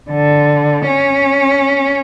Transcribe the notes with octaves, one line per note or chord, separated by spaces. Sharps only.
D3
C#4